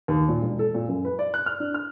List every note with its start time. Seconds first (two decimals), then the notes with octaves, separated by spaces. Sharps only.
0.08 D#2
0.29 A#2
0.42 E1
0.59 A4
0.75 A#2
0.88 F#2
1.05 B4
1.19 D5
1.34 F#6
1.46 F6
1.60 D4
1.74 F6